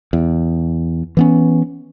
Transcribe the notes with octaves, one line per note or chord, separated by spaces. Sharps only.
E2
E3 B3 C#4